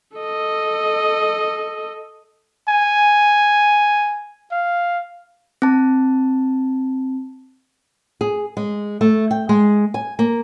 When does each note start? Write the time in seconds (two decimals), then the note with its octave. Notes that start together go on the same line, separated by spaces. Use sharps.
0.18 A4 D#5
2.68 G#5
4.52 F5
5.62 C4 A5
8.21 G#4
8.57 G#3
9.01 A3
9.31 G5
9.49 G#3
9.94 G#5
10.19 A#3